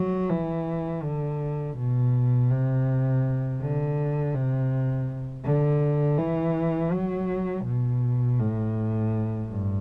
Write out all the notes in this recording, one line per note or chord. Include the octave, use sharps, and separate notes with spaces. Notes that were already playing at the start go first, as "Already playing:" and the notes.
Already playing: F#3
E3
D3
B2
C3
D3
C3
D3
E3
F#3
B2
A2
G2